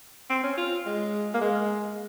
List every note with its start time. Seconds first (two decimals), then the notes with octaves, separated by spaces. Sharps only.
0.30 C4
0.43 C#4
0.57 F4
0.86 G#3
1.34 A#3
1.41 G#3